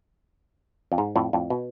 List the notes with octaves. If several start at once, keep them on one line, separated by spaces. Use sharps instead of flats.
F2
G#2
F2 A2
F2 A2
B2